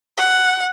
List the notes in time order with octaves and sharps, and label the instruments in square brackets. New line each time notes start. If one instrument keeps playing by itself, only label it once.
[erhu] F#5